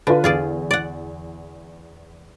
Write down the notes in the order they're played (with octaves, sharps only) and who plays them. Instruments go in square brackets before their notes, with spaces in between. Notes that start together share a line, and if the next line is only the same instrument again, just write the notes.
[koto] D3 [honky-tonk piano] F4 B4
[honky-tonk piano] E2 [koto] F4 G#4 D5
[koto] D5 F#5